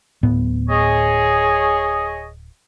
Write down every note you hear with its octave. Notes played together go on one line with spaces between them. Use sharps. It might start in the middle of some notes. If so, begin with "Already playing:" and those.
D1 A2 B3
G#4 C#5 D#5